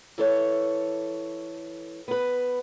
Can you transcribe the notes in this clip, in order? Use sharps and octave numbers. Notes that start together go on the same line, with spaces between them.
E3 A4 C#5
B3 B4